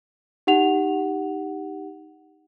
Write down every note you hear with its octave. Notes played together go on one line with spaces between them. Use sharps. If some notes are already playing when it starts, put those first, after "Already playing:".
D#4 G4 F#5 F7